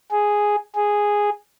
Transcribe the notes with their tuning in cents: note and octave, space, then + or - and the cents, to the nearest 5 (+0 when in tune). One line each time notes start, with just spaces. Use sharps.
G#4 +0
G#4 -5